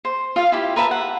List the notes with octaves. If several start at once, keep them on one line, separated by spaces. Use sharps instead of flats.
C5
F4 F5
E4 G4
A#4 B4 E5 A5
F#5